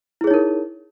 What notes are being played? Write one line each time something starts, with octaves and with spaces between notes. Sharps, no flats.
D#4 E4 G#4 A#4 C#5